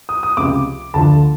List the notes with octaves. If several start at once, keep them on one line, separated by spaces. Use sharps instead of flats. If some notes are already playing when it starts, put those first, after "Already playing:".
D#6
D#6
C#2 C3 F3 D6
D2 D3 F3 A5